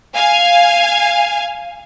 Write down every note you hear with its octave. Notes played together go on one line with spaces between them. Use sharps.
F5 G#5